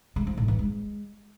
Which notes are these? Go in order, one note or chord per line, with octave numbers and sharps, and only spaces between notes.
G#3
F3
A2
E3
G#3